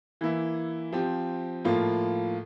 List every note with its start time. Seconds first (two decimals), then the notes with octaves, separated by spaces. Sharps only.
0.21 E3 A#3 E4
0.92 F3 C4 G4
1.65 A2 F3 A#3 F4